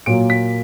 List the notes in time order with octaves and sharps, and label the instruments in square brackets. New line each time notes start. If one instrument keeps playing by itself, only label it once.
[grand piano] A#2 F#3 A#3 D7
B6